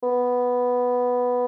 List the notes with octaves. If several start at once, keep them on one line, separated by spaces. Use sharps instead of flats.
B3